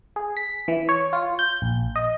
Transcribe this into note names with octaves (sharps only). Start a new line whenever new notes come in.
G#4
B6
E3
C#5
F4
G6
A#1
D#5